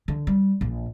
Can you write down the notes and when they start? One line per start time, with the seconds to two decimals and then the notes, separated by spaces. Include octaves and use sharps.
0.08 D3
0.27 G3
0.61 A#1